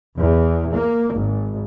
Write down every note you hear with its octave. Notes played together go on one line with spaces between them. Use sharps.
E2
A#3
G#1